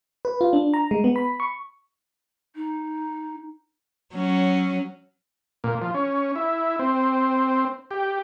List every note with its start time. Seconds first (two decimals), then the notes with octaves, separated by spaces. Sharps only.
0.25 B4
0.41 F4
0.53 D4
0.74 A#5
0.91 G#3
1.04 B3
1.16 B5
1.40 C#6
2.56 D#4
4.15 F#3 C#4
5.64 A#2
5.82 F3
5.94 C#4
6.36 E4
6.79 C4
7.91 G4